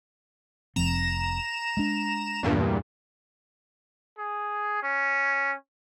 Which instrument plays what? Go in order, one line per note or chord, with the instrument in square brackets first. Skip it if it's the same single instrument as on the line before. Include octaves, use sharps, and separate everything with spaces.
[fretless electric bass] F1 F3 C4 [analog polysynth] A#5 E7
[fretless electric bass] G#3 D4
[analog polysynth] E2 G2 A#2
[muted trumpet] G#4
C#4